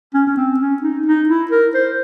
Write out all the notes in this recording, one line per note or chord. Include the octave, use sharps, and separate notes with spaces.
C#4
C#4
C4
C#4
D#4
D#4
E4
A#4
C5